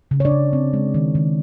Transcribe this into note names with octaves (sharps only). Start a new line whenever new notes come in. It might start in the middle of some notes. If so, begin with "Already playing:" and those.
C#3
C#5
D4 D5
C#3
C4
G#3
D#3
D#3